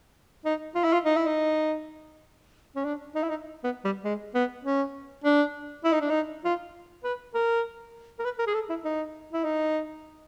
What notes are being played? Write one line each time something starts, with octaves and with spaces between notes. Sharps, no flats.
D#4
F4
E4
F4
D#4
E4
D#4
C#4
D4
D#4
E4
D#4
B3
G3
G#3
B3
C#4
D4
E4
D#4
D4
D#4
F4
B4
A#4
A#4
B4
A#4
G#4
A4
E4
D#4
E4
D#4